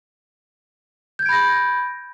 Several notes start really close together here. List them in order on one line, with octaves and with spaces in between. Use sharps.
G6 G#6 D7 B5 A#6